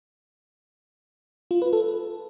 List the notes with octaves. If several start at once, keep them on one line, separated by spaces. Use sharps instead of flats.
F4
B4
A4